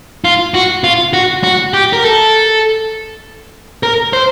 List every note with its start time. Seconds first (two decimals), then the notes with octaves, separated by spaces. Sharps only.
0.25 F4
0.54 F#4
0.84 F4
1.13 F#4
1.43 F#4
1.74 G4
1.93 A#4
2.04 A4
3.83 A#4
4.13 C5